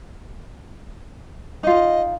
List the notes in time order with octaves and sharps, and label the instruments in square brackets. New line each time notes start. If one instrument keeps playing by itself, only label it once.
[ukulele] D#4 F4 [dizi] D#5